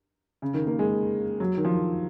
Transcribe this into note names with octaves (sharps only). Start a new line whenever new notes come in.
C#3
D#3
A#3
G#3
F#3
D#3
F3